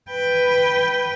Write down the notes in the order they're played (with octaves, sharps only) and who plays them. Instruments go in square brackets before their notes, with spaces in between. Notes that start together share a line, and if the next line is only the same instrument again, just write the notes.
[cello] B4 G5